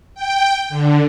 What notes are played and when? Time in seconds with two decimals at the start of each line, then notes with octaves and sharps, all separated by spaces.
0.14 G5
0.69 D3